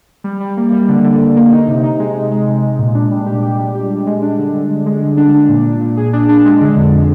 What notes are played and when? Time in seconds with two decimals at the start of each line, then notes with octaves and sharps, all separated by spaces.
0.24 G3
0.40 G3
0.57 A#3
0.72 G3
0.89 D3
1.05 D3
1.20 D3
1.36 A#3
1.52 D#4
1.68 C3
1.84 D#4
1.99 G#3
2.15 G#3
2.31 G#3
2.48 C3
2.63 G#3
2.79 A#2
2.95 D4
3.11 G3
3.26 G4
3.43 G4
3.59 G3
3.75 G4
3.90 G3
4.07 G#3
4.22 D4
4.38 D3
4.54 D3
4.70 D3
4.86 G#3
5.02 D3
5.17 D4
5.34 D4
5.49 A#2
5.66 A#2
5.81 A#2
5.97 G#4
6.13 D4
6.29 D4
6.45 G#3
6.61 D3
6.77 F2